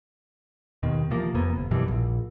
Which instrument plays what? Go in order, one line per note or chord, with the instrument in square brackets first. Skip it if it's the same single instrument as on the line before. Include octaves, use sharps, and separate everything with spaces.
[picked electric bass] D#2 B2 D#3
C3 E3 F3 A#3
F2 C3 A#3 B3
G1
F#2 B2 E3 G3
A#1